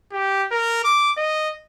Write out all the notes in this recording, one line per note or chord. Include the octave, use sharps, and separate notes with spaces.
G4
A#4
D6
D#5